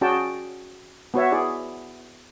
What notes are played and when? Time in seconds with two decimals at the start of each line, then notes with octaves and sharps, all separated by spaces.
0.01 C#4 F#4 G#4 D5 G5 A5
1.14 B3 F#4 C#5 E5
1.32 E4 G#4 D5